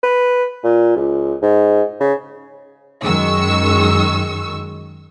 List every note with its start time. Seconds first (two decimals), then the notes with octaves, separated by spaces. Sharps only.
0.03 B4
0.64 A#2
0.96 C#2
1.42 G#2
2.00 C#3
3.03 F#2 D#3 G#3 C#6 E6